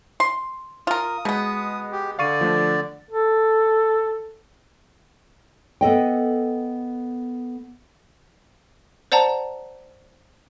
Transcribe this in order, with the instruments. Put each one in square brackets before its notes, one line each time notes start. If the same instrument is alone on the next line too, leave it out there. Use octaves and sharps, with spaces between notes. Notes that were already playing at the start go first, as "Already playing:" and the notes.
[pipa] C6
[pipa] F4 A#4 [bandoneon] D#6
[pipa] B2 B3 [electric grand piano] G#3
[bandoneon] G4
[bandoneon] D3 D5 [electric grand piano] F5 C#6 D#7
[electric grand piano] F3 A3 D4
[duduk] A4
[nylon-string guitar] B3 A4 D#5 G5
[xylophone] C5 D5 F#5 A5 A#5